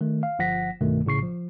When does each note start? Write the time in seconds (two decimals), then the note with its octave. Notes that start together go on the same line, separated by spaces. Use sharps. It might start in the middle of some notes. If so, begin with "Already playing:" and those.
0.01 D#3 A3
0.23 F5
0.39 G1 F3 F#5 A#6 B6
0.81 B1 G2 B2 D#3 A3
1.05 A#1 A2 C#3 C#6 C7
1.22 F3